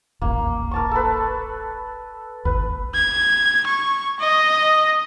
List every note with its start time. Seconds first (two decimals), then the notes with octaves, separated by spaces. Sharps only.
0.22 D#1 A1 A#3
0.71 A#4 A5 C#6
0.91 A4 B4
2.45 G#1 D#2 B4
2.94 G#6
3.66 C#6
4.19 D#5